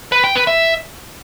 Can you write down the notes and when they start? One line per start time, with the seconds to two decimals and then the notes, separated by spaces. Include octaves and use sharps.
0.12 B4
0.24 G5
0.35 B4
0.47 E5